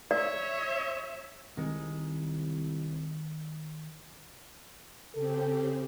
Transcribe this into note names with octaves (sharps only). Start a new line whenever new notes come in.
C#5 D5 E5
C2 D#3 G#3
C#3 C4 G4 A4